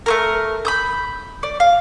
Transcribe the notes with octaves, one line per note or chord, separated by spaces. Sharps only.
A3 A#3 A#4
B5 D#6 G6
D5
F5